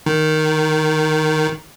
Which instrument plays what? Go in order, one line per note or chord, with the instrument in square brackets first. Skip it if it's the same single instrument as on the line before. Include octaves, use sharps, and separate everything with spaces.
[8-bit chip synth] D#3